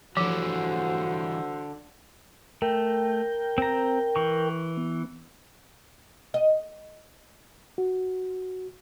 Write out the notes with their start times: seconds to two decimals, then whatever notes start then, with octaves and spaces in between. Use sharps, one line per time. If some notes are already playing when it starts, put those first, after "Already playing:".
0.17 D3 E3 F3 G3 F#4 C5
2.62 A3 A#4 G5
3.58 C4 A#5
4.16 E3 C#6
4.77 B3
6.34 D#5
7.78 F#4